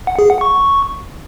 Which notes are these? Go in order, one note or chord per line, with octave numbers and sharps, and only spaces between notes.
F#5
G#4
F#5
C#6